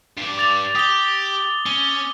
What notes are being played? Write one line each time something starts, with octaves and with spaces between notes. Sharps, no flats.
G2 D5
D6 A6 F7
G4 D#6 G7
C#4 G7